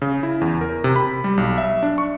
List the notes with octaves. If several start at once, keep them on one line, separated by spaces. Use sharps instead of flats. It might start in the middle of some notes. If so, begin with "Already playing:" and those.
C#3
E4
E2
A#4
C3
B5
G3
B1
E5
D4
C#6